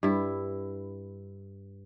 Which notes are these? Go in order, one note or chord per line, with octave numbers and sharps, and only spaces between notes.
G2 E4